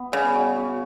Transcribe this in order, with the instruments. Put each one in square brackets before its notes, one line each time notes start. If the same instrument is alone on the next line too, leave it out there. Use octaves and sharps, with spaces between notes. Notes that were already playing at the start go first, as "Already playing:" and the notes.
Already playing: [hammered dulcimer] B3
[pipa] C#3 [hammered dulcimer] G3
[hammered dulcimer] F#4
F#4